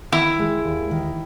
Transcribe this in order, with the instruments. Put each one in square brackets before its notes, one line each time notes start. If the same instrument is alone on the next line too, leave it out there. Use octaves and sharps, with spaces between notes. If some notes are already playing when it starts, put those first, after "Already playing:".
[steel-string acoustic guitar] D#3 [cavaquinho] E4
[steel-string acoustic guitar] G#3
D#2
D#3